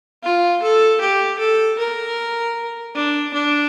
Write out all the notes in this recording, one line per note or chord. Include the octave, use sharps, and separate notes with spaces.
F4
A4
G4
A4
A#4
D4
D4